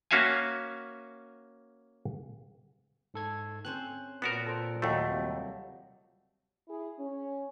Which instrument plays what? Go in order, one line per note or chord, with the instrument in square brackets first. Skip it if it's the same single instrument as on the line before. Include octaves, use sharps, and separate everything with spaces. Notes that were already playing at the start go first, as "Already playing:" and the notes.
[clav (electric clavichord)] A#3 C#4 F#4 E5 F5 G#5
[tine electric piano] G#2 A4 G#6
[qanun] C4 C#4 C5 [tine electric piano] F#6
[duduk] A#2 [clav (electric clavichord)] B3 F#4 A#4 [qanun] D5 D6
[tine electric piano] A4 C5
[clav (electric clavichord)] D#2 A3 [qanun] F3 F#3
[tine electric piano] C3 G3
[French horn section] E4 G#4
C#4